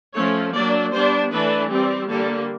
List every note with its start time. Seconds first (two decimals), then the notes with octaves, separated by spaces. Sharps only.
0.14 F3 A3 C#4 C#5
0.54 F#3 A#3 D4 D5
0.93 G3 B3 D4 C5
1.31 E3 A3 D4 B4
1.71 G3 C4
2.10 D3 G3 A#3 A4